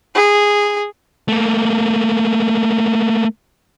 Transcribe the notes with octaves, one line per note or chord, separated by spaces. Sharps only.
G#4
A3 A#3